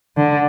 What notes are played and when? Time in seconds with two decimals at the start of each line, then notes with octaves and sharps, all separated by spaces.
0.17 D3